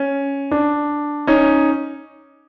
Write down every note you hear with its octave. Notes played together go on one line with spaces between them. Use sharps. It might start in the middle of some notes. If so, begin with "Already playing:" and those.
Already playing: C#4
D4
C#4 D#4